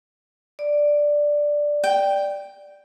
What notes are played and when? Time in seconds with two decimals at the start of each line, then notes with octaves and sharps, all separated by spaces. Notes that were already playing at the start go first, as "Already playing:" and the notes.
0.59 D5
1.84 G5